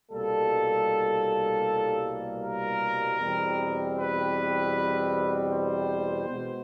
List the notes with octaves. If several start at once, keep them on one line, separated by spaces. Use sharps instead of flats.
C2 B2 G3 A#3 A4
A#4
E2 B2 G3 C4
B4
C5
B2 G#3 B3